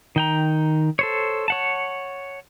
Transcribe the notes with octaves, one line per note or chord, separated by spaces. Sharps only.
D#3 G5 A#5
A4 C5 C#5
C#5 F#5 A5